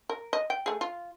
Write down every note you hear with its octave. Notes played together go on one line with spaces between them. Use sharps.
A#4
D#5
G5
A3 G#4
F4